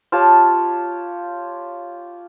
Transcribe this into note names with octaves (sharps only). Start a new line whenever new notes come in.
F4 G4 C#5 A5